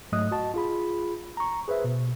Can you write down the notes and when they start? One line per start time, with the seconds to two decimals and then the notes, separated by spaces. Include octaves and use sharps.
0.12 G#2 F#3 A3 D#5 D#6 F#6
0.31 F#4 D#5 A5
0.54 F4 G#4 B5
1.37 A#5 C#6
1.68 G#4 B4 C5 E5
1.84 B2